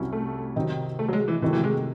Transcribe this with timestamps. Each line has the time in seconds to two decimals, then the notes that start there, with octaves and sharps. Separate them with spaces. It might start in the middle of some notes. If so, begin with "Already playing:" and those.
Already playing: C2 C3 F#3 C#4 E4
0.13 A3
0.56 C3 D#3 F#3 C4 D#4
0.99 A3
1.08 F#3
1.13 G#3
1.28 E3
1.42 C3 D#3 E3 F#3 A3
1.53 E3
1.64 G#3